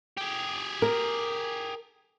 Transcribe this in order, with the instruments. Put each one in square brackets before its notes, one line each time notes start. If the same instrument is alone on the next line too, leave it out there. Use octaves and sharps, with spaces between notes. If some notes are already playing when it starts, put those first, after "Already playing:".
[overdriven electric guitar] G4 G#4
[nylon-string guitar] A#4